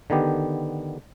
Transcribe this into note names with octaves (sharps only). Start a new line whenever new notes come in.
D3 D#3 B3 G4